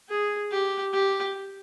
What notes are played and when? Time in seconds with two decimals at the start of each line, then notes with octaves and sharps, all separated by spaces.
0.09 G#4
0.51 G4
0.93 G4